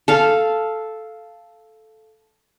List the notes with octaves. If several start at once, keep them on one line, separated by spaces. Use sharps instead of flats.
A4 F5